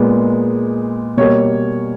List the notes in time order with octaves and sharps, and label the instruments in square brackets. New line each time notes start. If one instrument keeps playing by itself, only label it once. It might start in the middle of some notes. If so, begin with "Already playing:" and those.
Already playing: [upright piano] A#2 G#3 B3
B2 G3 A#3 C#5